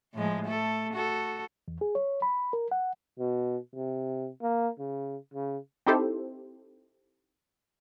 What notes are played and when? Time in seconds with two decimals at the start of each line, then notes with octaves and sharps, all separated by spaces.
0.14 A2 F3 G#3
0.45 A3 A4
0.93 F#4 A4
1.68 E2
1.81 G#4
1.95 C#5
2.22 B5
2.53 A#4
2.71 F#5
3.19 B2
3.75 C3
4.42 A#3
4.79 C#3
5.34 C#3
5.86 C4 D#4 E4 G4 A4 C5